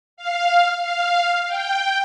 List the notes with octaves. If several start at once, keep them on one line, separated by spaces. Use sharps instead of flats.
F5
F5
G5